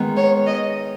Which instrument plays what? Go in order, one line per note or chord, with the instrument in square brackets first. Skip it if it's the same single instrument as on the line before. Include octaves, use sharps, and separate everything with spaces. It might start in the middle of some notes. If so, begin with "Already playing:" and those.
Already playing: [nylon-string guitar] D#3 G#3 B3
[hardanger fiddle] C#5
D#5